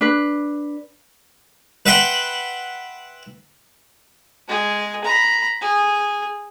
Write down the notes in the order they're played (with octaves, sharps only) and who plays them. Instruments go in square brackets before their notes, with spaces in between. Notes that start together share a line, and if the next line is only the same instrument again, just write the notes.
[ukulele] D4 B4
[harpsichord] B4 E5 F#5 G5 B5 C6
[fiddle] G#3 G#4
A#5 B5
G#4